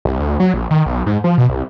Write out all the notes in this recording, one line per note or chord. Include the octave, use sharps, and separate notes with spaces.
C2
D2
F#3
A#1
D#3
B1
G#2
F3
B2
C2